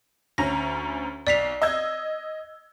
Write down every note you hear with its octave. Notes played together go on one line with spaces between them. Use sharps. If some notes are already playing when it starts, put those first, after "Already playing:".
D2 C#4 A#5 A#6
B1 D5 B6 C7 F7
D#5 E6 G#6